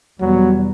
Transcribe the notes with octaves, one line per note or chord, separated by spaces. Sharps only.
E2 B2 F#3 G3 B3